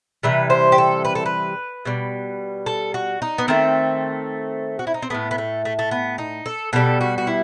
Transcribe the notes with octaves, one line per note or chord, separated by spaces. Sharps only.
C3 E3 G3 B4
C5
G4
A4
B4
A4
B4
B2 G3
A4
F#4
D#4
B3
D#3 A3 C4
F#4
E4
D#4
C4
A2 F#3 A3 B3
B3
A3
A3
A3
B3
D#4
A4
B2 G3 A4
F#4
F#4
E4